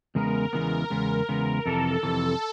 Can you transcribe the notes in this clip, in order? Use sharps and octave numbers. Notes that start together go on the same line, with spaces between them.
E2 C#3 G#3 B3 A#4
E2 C#3 E3 G#3 B3
E2 C#3 G#3 B3
E2 C#3 G#3 B3
F2 C3 E3 A4
F2 C3 E3